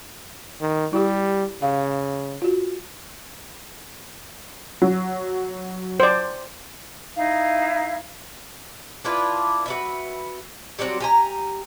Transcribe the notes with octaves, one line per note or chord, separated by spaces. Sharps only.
D#3
G3 E4 G4
C#3 F5
F4 F#4
F#3
C5 D5
D#4 E4 F5
D4 E4 F4 B4
F#4 B4 E5
F#3 G3 C4 F#4
G4 G#5 A#5